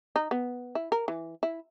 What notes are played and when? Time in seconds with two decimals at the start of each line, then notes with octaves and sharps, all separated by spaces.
0.16 D#4
0.31 B3
0.75 E4
0.92 A#4
1.08 E3
1.43 E4